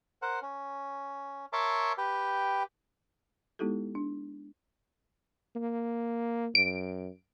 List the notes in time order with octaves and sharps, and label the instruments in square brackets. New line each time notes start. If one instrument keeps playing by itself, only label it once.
[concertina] A#4 C5 F#5
C#4
A#4 C#5 E5 A5 C6 D6
G4 B4 G5
[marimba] G#3 B3 D#4 E4 G4 A4
D4
[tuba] A#3
[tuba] F#2 [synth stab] D7